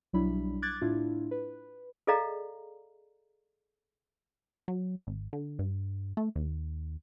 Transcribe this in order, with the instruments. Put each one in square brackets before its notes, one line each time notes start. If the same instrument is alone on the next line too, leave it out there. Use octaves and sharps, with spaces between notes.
[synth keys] B1 F#3 G3 D4 E4 B5
D6 F#6 G#6 A6
A2 D4 E4 F4
B4
[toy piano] G#4 A4 D5 D#5 F5 A#5
[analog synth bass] F#3
G#1
D3
G2
A3
D#2